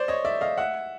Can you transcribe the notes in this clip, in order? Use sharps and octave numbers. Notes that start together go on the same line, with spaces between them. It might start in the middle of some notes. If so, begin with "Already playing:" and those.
Already playing: C5 D5
C#5 D#5
D5 E5
D#5 F5
E5 F#5